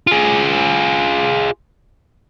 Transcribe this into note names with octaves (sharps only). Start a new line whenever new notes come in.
F4 G#4